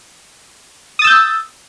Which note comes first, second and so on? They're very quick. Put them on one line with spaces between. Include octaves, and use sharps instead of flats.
D#6 A6 E6 G6